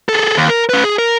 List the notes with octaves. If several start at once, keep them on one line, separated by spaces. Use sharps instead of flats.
G#4 A4
D#2
A#4
C#4 B4
G#4
A#4